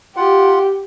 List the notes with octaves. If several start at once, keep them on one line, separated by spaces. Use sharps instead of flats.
F4 G4 F#5